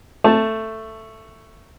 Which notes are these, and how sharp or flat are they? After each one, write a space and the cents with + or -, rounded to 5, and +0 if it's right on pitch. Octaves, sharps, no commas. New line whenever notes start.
A3 +10 A5 +0